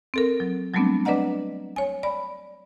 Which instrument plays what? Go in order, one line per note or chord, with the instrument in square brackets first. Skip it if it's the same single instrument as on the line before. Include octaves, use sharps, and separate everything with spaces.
[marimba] C4 A4 A#4
F#3
F#3 G3 A3 B3 C4 D4
D4 B4 D5 D#5 F#5 A#5
C#5 G#5
D5 B5